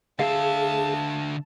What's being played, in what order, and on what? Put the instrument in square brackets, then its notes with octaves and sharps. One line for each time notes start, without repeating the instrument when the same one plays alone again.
[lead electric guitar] D3 E5 [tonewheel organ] G#4 [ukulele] F5 [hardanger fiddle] A5